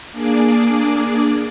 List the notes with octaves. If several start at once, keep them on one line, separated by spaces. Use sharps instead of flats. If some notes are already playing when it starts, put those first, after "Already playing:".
A#3 D4 G#4 D5